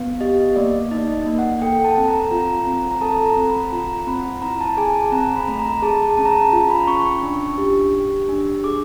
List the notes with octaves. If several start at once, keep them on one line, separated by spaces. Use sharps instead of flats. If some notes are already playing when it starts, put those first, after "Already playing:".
Already playing: B3
G4 D#5
A#3 D5
D#4 D#5
A#3
F#5
A4 G5
A5
C4
A#5
F4 A#5
C4
A#5
A4 A5
A#5
C4
B5
F4 A#5
C4 B5
E4 A#5
A5
G#4 G#5
A5
C4 A#5
B5
A3
A#5
G#4 A5
C#4 A5
A#5
A5
F4 A#5
B5
C#4 C#6
C#6
D4
G4
G4
D4
G#4 D6